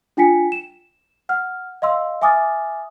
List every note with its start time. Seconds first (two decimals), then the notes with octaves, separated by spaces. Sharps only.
0.17 D4 F4 G5 G#5 B6 C#7
0.52 E7
1.29 F#5 F6
1.82 D#5 F5 C6 E6
2.22 E5 G#5 D6 D#6 F6 A6